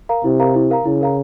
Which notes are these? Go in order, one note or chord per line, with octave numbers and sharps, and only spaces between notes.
A#4 F5 A#5
C3 E4
A#4 F5 A#5
E4
A#4 F5 A#5
C#3 E4
A#4 F5 A#5